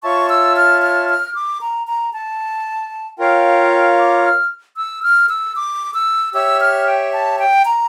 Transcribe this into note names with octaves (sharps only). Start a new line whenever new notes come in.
F4 C#5 E5 A5 C#6
E6
F6
F6
F6
D6
A#5
A#5
A5
F4 A#4 C#5 F5 G5
D6
F6
E6
F6
E6
D6
E6
G4 C#5 E5 E6
F6
G5
A5
G5
A#5